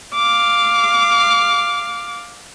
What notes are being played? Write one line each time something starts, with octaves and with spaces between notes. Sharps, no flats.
F5 D6